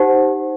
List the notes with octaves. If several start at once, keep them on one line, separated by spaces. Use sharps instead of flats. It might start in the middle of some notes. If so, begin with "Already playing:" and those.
Already playing: D#4 G4 C5 F#5